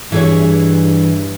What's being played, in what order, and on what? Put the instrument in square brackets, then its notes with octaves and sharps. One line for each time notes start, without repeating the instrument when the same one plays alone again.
[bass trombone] G2 [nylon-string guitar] E3 G#4 C#5